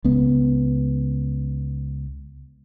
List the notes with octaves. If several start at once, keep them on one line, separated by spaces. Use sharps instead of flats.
C#2 B3